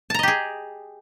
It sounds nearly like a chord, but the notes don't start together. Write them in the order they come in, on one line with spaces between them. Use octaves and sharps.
A5 A#5 D#5 G4 G#4